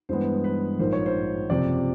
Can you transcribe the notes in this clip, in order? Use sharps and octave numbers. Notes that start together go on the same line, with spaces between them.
G2 E3 G#3 B3 C5
B4
A#1 G#2 F3 A#3 D#4 C5
C#5
C5
F#1 F2 C3 F3 D5